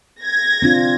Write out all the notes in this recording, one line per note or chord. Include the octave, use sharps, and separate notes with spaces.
G#6 A#6
C4 D4 F4